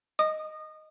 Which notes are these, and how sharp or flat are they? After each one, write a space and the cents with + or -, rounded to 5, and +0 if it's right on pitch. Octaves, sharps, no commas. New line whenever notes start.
D#5 +0 D#6 -30